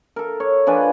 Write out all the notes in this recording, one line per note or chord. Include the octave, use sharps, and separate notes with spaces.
A4 A#4
C#5
F3 D4 B4 G#5